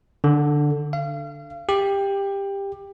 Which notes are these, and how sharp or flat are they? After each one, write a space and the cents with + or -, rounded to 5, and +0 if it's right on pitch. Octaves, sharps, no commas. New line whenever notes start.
D3 +5
F5 -35
G4 +15